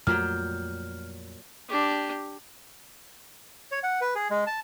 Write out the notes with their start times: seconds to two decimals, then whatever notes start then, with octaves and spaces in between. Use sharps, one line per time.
0.07 F2 A#2 F#3 A3 G5 F6
1.69 D4 G4
3.71 C#5
3.83 F#5
4.01 B4
4.15 G#4
4.30 G#3
4.47 A5